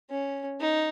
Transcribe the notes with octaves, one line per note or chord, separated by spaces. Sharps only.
C#4
D#4